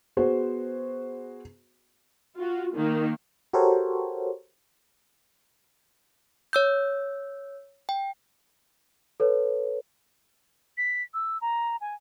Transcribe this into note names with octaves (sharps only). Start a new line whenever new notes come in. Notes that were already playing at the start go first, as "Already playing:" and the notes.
B3 F#4 G#4 C5
F4 F#4
D#3 A#3
F#4 G4 A4 A#4 C5 C#5
C#5 E6 G6
G5
A4 B4 C#5
B6
E6
A#5
G#5